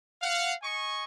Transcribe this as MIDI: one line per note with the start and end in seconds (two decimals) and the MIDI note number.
0.22 0.53 77
0.22 0.53 78
0.63 1.04 75
0.63 1.04 80
0.63 1.04 85